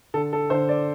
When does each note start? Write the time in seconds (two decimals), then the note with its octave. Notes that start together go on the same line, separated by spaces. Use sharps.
0.14 D3 A4
0.33 A4
0.50 D3 C5
0.69 D5